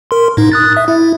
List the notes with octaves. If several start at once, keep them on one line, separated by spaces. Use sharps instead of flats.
A#4 C6
A2 D#4
D#6 F#6 A6
E5
E4